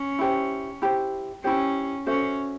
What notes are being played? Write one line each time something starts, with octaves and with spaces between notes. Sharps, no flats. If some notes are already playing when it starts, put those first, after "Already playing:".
Already playing: C#4
E4 G4 C5
E4 G4 C5
C#4 E4 G4 C5
C#4 F#4 A4 C5 E5